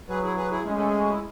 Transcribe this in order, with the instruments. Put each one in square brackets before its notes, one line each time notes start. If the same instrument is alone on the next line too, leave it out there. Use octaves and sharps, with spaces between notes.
[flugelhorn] F#3 [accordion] G#4 B4
[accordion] E4 G#4
G#4 B4
E4 G#4
[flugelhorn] G#3 [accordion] A3 C#4
[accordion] A4
G#4
F#4
E4